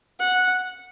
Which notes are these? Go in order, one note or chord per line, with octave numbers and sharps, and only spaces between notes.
F#5